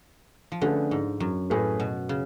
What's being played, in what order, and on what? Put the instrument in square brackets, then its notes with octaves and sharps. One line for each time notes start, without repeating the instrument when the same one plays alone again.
[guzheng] F3
[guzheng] D3 [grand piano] A3 C#4 G#4 B4
[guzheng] G#2
F#2
[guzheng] A2 [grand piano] A3 C#4 G#4 B4
[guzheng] B2
C#3